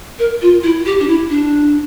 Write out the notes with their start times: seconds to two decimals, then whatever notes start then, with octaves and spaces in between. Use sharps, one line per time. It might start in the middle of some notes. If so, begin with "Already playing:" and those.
0.19 A#4
0.42 F4
0.63 E4
0.86 G4
1.00 D4
1.08 E4
1.30 D4